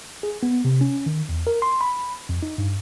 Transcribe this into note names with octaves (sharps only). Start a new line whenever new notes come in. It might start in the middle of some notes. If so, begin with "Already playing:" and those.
G#4
B3
C3
C#4
D#3
E2
A#4
C6
B5
F2
D#4
G2